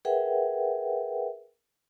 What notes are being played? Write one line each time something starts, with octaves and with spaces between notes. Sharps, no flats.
G#4 A#4 B4 E5 F#5 G5